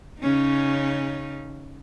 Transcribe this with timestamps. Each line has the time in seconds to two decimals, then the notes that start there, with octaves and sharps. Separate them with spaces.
0.21 C#3 C#4 D#4